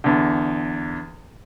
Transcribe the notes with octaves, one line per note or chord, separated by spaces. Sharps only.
E2 D3